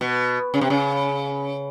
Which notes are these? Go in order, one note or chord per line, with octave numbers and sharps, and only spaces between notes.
B2
C#3
C3
C#3